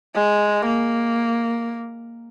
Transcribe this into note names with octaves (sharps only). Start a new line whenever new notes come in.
G#3
A#3